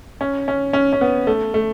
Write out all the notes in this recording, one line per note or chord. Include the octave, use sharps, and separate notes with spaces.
C#4
C#4
C#4
C#4
B3
A3
A3